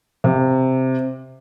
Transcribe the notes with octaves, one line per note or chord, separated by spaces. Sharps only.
C3